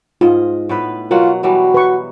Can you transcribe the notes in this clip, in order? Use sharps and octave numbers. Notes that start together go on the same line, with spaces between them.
G#2 F4 D#5
A2 B3 B4
B2 F#3 F4 A#4 F#5
E3 F#3 G3 F#4
B4 C#6